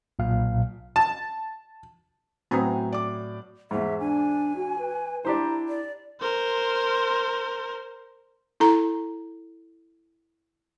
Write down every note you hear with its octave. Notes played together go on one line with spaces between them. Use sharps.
B1 A#2 F5
A5
A2 F#3 B3 C4 G#5 A#5 D#6
D5 D6
E2 G#2 G#4 E5
D4 G#5
F#4
B4
D4 E4 G4 C5 A#5
D5
A#4 C5
E4 A4 A#5